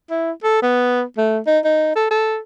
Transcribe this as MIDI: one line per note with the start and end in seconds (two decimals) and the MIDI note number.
0.10 0.31 64
0.43 0.61 69
0.62 1.03 59
1.18 1.39 57
1.47 1.59 63
1.65 1.94 63
1.96 2.08 69
2.11 2.38 69